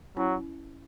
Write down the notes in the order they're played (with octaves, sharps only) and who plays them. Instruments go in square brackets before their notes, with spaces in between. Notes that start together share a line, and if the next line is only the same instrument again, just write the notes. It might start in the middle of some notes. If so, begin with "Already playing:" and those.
[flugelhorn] F#3 [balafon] C#4 E4